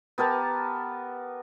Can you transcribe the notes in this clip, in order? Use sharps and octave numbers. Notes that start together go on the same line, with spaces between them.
B3 G4 A#4 A5